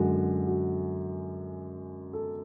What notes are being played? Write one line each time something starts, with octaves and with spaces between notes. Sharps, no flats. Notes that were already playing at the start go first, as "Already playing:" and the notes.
Already playing: F#2 D3 G#3 F#4
F#4
A4